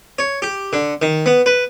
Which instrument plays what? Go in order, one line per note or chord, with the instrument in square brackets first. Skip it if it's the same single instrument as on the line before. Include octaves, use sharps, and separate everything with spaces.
[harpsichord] C#5
G4
D3
D#3
B3
B4